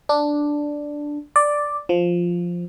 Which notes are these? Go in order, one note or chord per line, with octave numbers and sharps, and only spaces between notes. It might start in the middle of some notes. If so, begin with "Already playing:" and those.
D4
D5
F3